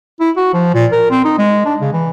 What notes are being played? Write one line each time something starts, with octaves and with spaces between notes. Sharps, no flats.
E4
F#4
F3
A#2
A#4
C4
D#4
G#3
D4
C#3
E3